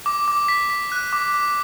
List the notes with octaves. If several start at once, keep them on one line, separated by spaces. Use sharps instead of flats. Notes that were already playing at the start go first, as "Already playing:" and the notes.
D6
D6
B6
B6
F#6
D6
D6